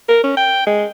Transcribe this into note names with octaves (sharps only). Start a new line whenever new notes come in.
A#4
C#4
G5
G#3